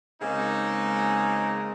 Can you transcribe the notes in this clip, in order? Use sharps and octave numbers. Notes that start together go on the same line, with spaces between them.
C#3 G#3 A#3 C4 D#4